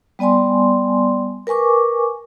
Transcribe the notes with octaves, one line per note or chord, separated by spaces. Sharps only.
G3 B3 D5 G#5 C6
A#4 B4 G#5 C#6 D6